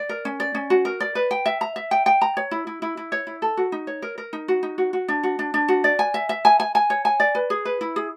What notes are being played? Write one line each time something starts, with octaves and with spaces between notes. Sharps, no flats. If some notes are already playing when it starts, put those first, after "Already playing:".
Already playing: D5
A#4
C#4
D5
C#4
F#4
A#4
D5
B4
G5
E5
A#5
E5
G5
G5
A#5
C#5
E4
E4
E4
E4
C#5
E4
A4
F#4
D#4
C#5
A#4
A#4
D#4
F#4
D#4
F#4
F#4
D4
F#4
D4
D4
F#4
D5
G#5
E5
E5
G#5
G#5
G#5
C#5
G#5
D5
B4
G#4
B4
E4
G#4